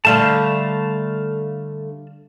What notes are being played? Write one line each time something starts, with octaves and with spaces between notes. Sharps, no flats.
D3 G3 A3 F5 A5